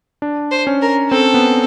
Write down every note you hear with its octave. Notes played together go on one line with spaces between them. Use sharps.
D4
C5
C#4
A#4
C4 A4
B3